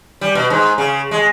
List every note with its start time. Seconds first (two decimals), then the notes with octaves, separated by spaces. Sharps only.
0.21 G3
0.35 B2
0.50 G#2
0.78 C#3
1.11 G#3